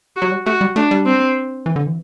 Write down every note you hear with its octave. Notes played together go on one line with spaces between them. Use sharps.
F#4
F#3
G3
A3 F#4
G3
A3 D4
G3
C4
E3
D3
E3